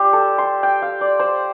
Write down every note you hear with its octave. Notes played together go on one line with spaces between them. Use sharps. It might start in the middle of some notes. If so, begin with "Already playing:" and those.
Already playing: G3 F4 G4 C5
A4
C6
G5
F5
D5
C5